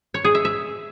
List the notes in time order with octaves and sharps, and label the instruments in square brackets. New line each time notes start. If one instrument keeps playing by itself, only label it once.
[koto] C#5
G#4
E5
E5